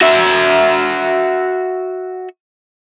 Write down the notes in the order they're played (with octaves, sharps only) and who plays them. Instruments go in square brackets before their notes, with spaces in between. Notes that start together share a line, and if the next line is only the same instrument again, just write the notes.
[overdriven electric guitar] F#4 E5